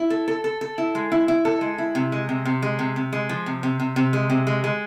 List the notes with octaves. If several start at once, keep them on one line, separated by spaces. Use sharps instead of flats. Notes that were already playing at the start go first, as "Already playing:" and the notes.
Already playing: E4
A4
A4
A4
A4
E4
G#3
E4
E4
A4
G#3
E4
C3
G#3
C3
C3
G#3
C3
C3
G#3
F3
C3
C3
C3
C3
G#3
C3
G#3
G#3